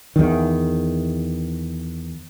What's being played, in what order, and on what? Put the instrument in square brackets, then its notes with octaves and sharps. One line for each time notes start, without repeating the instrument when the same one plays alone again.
[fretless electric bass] E2 D#3